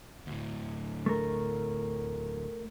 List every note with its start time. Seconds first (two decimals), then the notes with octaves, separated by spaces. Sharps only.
0.27 D2 A2
1.06 A3 A#4